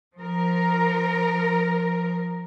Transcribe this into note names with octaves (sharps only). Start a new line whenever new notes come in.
F3 A#4